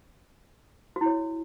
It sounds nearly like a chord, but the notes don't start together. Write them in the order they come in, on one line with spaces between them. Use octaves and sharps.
F#4 E4 C#5